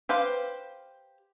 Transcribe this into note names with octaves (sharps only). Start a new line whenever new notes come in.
G4 B4 C5 F5